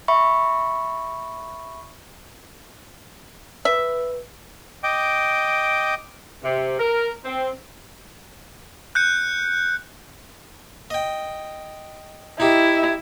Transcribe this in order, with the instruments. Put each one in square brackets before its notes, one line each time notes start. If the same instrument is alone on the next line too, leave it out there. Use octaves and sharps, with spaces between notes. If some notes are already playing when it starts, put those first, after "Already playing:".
[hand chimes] E5 B5 C#6
[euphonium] B4 [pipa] E5
[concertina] D#5 G5 D6
[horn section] C3
A#4
C4
[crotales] F#6 G6 C#7
[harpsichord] D#5 G5
[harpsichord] D#4 G4 [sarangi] E4